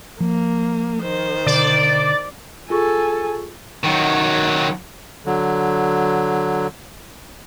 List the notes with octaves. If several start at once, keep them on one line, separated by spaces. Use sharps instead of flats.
F3 A#3
D#3 C5
B2 D3 D5
F4 G#4 A4 G#5 C#6
D#3 F#3
D3 F#3